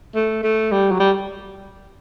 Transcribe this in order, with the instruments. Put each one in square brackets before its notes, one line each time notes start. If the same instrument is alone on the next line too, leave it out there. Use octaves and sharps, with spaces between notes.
[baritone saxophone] A3
A3
G3
F#3
G3